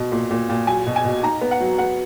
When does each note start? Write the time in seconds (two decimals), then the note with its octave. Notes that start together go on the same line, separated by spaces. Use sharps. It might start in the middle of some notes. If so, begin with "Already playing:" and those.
Already playing: B2
0.12 A#2
0.31 A#2
0.49 A#2
0.67 F#3 G#5
0.87 B2
0.96 G#5
1.05 B2
1.23 D#4 A#5
1.41 B3
1.51 F#5
1.61 F#3
1.78 B3 F#5